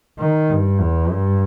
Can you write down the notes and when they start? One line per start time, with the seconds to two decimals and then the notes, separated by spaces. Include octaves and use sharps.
0.19 D#3
0.50 G2
0.82 E2
1.13 G2